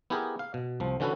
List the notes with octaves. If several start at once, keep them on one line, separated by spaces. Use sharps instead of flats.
B3 E4 G4 G#4 A#4
F5
B2
C2 F3
D3 E3 C#4 F#4 A4 B4